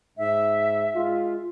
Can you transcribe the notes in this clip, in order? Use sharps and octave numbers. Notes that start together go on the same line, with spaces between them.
G#2 E5
G#3 F4